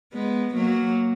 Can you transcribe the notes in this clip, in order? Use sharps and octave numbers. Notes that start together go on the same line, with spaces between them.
G#3 B3
F#3 A#3